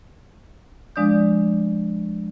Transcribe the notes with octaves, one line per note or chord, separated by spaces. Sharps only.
F3 G#3 D4 D5 D#6 G6